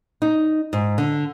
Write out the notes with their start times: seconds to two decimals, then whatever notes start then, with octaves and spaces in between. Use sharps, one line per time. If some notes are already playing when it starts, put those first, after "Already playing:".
0.22 D#4
0.73 G#2
0.98 D3